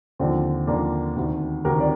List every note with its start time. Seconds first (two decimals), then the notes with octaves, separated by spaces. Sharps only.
0.19 D#2 D3 F3 C4
0.67 D#2 D3 F3 A#3 D4
1.16 D2 C3 D#3
1.65 D2 C3 D#3 G4 A#4
1.80 D5